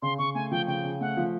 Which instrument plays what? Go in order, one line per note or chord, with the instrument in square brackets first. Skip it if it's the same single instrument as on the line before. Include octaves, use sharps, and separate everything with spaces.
[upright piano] C#3 [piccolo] C6
[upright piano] C#3 [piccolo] C#6
[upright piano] A3 [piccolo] G#5
[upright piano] F3 [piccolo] G5
[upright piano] C#3 [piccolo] G5
[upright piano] C#3
[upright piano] A3 [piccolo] F#5
[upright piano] F3